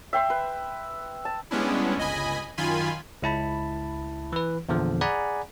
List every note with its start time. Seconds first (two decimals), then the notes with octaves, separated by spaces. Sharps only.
0.13 E5 G5 C6
0.30 B4
1.25 A5
1.51 G3 G#3 B3 C#4 D4 E4
1.97 G1 C#2 D#5 G#5 B5
2.57 F#2 D#3 F4 G#5 B5 C6
3.22 C#2 E4 A5 B5
4.33 E3 B4
4.69 E2 A#2 D3 F3
5.01 G#4 D5 F#5 G#5 A#5 B5